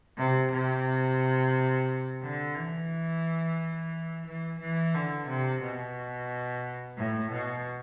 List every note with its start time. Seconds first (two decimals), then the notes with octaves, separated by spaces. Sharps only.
0.18 C3
0.52 C3
2.22 D3
2.55 E3
4.26 E3
4.60 E3
4.95 D3
5.27 C3
5.62 B2
6.98 A2
7.32 B2